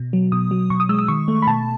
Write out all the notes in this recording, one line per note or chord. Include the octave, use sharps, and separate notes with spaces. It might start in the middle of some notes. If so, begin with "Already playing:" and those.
Already playing: B2
F#3
B2 D#6
F#3
B2 C#6
D#6
G#3 E6
D#6
D#3 C#6
A3
B5
B2 A5